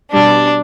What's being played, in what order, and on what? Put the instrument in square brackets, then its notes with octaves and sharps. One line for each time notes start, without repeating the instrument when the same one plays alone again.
[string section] B2 G3 D4